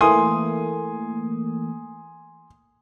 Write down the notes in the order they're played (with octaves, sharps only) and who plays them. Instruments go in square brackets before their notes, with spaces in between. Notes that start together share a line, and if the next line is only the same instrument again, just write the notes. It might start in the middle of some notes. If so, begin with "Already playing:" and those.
[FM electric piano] E3 A3 A#3 [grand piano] G#5 C6 D#6